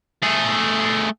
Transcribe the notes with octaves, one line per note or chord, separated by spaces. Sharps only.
A3 G#4